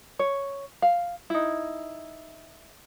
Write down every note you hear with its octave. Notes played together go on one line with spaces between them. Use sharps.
C#5
F5
D#4 E4